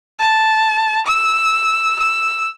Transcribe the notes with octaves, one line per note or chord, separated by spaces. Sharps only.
A5
E6
E6